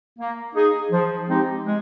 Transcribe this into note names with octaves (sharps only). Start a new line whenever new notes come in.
A#3
D#4 G#4
F3
G#3 C4 D#4 G4
G#3